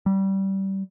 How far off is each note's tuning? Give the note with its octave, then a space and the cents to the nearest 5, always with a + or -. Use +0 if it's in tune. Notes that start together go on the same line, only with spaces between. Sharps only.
G3 -20